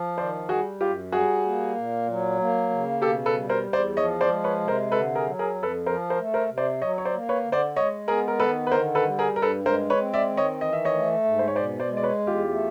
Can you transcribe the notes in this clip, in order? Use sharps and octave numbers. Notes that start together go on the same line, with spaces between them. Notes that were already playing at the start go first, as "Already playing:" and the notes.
Already playing: F3
D#3 C5 D5
G3 F#4 G#4
F#2 F4 G4
G3 F#4 G#4
A#3
A#2
F#3
A#3
C#3
B2 G4 A4
A4 B4
G3
A#4 C5
E2
C5 D5
F3 C#5 D#5
C5 D5
G#3
B4 C#5
C3
A#4 C5
D3 A4 B4
G#4 A#4
F#3
G#4 A#4
F2
A4 B4
F3 A#4 C5
A#4 C5
A3
A#4 C5
C3
C5 D5
F#3 C#5 D#5
C#5
C5 D5
A#3
B4 C#5
D3
C5 D5
G#3 C#5 D#5
B3 G#4 A#4
A#4
D#3 A4 B4
B4
D3 A#4 C5
A4 B4
G3
G#4 A#4
G2 A#4
A4 B4
G#3 A#4 C5
B4 C#5
C4
D5 E5
D#3
C#5 D#5
E3 D#5
E5
C#5 D#5
A3
G#2
C5
C#5
B2 C5 D5
C5 D5
G#3
D5
B4 C#5
E2
F4 G4
A3